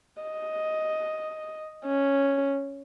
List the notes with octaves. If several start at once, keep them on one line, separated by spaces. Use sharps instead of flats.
D#5
C#4